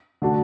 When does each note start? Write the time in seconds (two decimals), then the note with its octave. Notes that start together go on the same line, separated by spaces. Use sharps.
0.22 D3 A3 D4 F#4